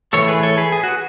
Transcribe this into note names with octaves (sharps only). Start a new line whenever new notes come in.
A2 E3 A3 A4 C#5
G#4 B4
A4 C#5
G#4 B4
G#4
F#4